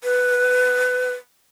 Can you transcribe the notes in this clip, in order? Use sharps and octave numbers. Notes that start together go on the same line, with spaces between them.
B4